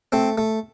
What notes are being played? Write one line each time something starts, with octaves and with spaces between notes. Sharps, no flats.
A3 C4
A3